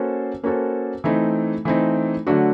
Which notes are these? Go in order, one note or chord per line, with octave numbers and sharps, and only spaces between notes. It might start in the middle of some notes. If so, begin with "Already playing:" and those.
Already playing: A#3 C#4 F#4 A4 C5
A#3 C#4 F#4 A4 C5
E3 A3 C4 D#4
E3 A3 C4 D#4
D3 F#3 A3 D4 F#4